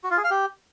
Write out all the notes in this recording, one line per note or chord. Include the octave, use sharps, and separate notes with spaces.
F#4
F4
G#4
F5
G4